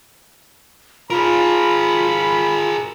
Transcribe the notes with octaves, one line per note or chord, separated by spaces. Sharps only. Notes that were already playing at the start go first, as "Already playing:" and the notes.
F4 G#4 A#4 B5